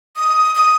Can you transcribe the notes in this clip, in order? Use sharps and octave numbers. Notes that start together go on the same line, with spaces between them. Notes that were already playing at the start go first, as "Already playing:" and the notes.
D#6
D#6